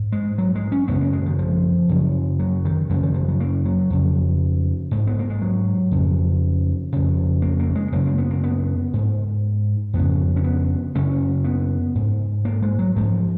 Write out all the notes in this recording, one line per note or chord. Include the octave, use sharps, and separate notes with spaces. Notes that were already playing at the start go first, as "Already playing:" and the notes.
Already playing: G#2
G#3
F#3
G#3
C#4
F#2 C#3 B3
A#3
G#3
D#3
F3
F#2 C#3
F#3
D#3
F#2 C#3 F3
D#3
F3
F#3
A#3
F#3
F2 C#3
G#2
B3
A#3
G#3
F#3
F2 C#3
F2 C#3
A#3
A#3
G#3
F#2 C#3 A#3
A#3
B3
A#3
B3
G#2
F2 C#3 B3
C#4
B3
F#2 C#3 C#4
B3
G#2
A#3
G#3
F#3
G#2 F3